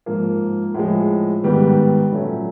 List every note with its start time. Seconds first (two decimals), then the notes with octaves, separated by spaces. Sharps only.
0.06 G#2 F3 A#3
0.74 A2 F3 G#3
1.43 G#2 D#3 G3 B3
2.12 A#2 F#3 A3 C#4